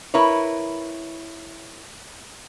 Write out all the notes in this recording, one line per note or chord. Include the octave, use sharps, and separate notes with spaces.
E4 A#4 B4 C#5